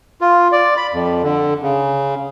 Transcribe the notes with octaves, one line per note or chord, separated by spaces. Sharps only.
F4
D5
B5
F2
D3
C#3